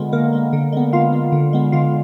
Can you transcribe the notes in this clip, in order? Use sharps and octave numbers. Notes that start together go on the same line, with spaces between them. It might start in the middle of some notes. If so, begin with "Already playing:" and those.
Already playing: D3 G#3 B3 F4
D3 A#3 A#4
G#3 B3
D3
G#3 B3
D3 F4 F5
G#3 B3
D3
G#3 B3
D3 F4 F5